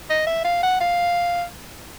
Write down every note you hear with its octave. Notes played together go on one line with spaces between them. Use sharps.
D#5
E5
F5
F#5
F5